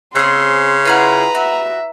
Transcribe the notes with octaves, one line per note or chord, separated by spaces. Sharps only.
C#3 C4 G#4 C6
E4 F4 G#4 B4 F#5 A#5
F#4 E5